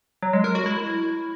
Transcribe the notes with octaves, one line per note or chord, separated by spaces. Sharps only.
F#3
G#3
A#4
F#4
E4